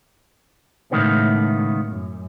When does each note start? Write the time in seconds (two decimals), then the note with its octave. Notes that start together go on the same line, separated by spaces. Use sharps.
0.91 C#2 A2 D#3 B3
1.86 F#2